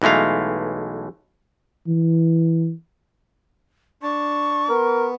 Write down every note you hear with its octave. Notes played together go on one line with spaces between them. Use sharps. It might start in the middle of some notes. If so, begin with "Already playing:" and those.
B1 E3 G#3 A3 F5
E3
D4 A5 C#6
B3 A#4